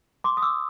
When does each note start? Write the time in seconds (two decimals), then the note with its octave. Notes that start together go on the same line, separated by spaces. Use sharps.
0.24 C6 D6
0.37 D#6
0.42 D6 E6